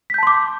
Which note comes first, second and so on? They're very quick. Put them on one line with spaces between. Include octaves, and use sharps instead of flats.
B6 G6 A5 C6 D6